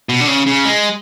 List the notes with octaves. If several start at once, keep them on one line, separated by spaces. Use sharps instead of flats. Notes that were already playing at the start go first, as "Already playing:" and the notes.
B2
D3
C#3
C#3
G#3